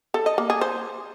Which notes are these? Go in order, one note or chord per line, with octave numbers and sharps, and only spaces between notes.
A4
D#5
A#3
G#4
C5